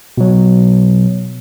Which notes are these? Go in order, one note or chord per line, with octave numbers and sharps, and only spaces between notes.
B2 F#3